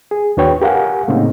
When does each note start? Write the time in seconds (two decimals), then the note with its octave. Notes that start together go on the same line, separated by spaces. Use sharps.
0.11 G#4
0.37 D#2 D4 F#4 B4 C#5 G5
0.62 G4 A#4 F5 F#5 G#5
1.08 A2 C#3 A3 A#3 C4 D#4